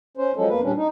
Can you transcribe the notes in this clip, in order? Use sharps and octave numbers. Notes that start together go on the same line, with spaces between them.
C#4 C5
F3 F#3 G#3 C#4 A4
E2 A#3 B4
A#2 G3 C#4 D4
D#4